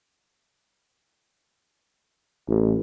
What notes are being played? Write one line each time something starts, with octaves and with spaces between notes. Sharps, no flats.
A1